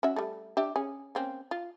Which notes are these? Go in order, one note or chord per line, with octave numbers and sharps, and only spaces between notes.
C#4 F#4 E5
G3 A3
D4 G4 E5
C#4 G#4
A#3 C4 C#4
F4